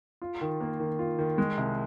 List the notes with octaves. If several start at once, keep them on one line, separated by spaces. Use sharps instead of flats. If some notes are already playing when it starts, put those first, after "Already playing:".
F4
D#3
A#3
D#3
F4
D#3
G#3
C2